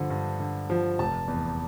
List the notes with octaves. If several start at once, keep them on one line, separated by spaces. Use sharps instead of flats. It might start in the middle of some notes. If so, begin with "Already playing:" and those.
Already playing: G2 D3 F3
G2
D3
F3
F1 A5
E2